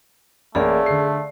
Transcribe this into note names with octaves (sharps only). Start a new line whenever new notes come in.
A1 A3 A#3 G#4 D5 F5
D3 C7